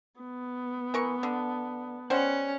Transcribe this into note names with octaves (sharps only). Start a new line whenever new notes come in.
B3
E3 A#4 C#6
D3
G3 C#4 C5 F#5